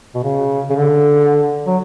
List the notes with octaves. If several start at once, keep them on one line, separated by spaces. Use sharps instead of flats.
B2
C#3
C#3
D3
F#3